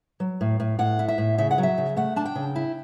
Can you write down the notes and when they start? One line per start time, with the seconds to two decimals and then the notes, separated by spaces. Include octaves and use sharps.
0.20 F#3
0.41 A2
0.60 A2
0.79 A2 F#5
0.99 E4
1.08 E5
1.18 A2
1.38 C#3 E5
1.51 F#5
1.58 F#3
1.63 E5
1.78 C#3
1.97 A3 F#5
2.16 D4 A5
2.25 G5
2.35 C#3
2.56 E4